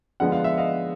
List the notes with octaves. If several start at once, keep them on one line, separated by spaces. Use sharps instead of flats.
D3 F3 G#3 B3 F#5
F5
E5
D#5 F5